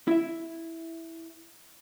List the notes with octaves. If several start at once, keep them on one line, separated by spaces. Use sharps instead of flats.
E4 E5